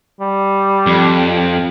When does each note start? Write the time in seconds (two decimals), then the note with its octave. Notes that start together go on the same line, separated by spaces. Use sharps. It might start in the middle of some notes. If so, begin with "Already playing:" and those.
0.21 G3
0.86 F2